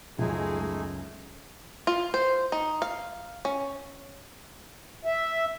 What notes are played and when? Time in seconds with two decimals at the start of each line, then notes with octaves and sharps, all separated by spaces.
0.19 C#2 F#2 G#3 A3 D#4 G#4
1.87 F4
2.14 C5
2.52 D#4
2.82 F5
3.45 C#4
5.05 E5